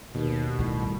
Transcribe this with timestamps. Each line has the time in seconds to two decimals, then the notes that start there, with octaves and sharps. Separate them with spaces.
0.14 D#2 B2
0.59 A2 D#3 G3